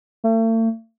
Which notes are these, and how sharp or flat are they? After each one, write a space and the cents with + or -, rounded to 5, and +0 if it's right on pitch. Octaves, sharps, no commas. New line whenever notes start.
A3 +40